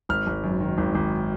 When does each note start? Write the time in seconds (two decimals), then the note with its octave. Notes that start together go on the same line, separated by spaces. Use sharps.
0.09 G#1 F6
0.27 G#1
0.44 F#2
0.60 D#3
0.78 G#1
0.95 G#1